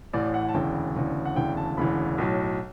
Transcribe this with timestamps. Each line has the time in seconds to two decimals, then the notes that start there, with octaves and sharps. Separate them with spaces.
0.13 A1 A2 E3 D5
0.34 F#5
0.49 A5
0.54 E1 D2 C#3 E3 G5
0.95 E1 D2 C#3 E3
1.25 F#5
1.36 E1 D2 C#3 E3 G5
1.57 A5
1.77 E1 D2 C#3 E3 B5
2.18 B1 A2 F#3